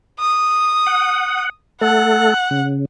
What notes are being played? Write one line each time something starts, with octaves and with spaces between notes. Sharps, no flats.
D#6
F#5
A3 A4 F#5
C#3